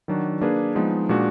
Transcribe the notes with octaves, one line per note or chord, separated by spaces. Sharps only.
D#3 F#3 D4 F#4
A#3 D4 G#4 B4
F3 G#3 B3 D#4
A#2 G#3 D4 F#4